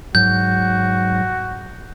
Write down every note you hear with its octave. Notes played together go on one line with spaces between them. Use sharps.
G#2 F#3 F#4 G6